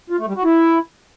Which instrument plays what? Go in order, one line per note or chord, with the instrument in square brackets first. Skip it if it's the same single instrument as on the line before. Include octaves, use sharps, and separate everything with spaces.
[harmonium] F4
A3
G3
F#4
E4